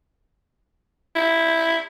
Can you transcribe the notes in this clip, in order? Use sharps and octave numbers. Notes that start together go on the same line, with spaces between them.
E4